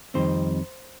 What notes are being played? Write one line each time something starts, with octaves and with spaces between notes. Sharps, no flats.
F2 D#3 G3 C4 D#4 C5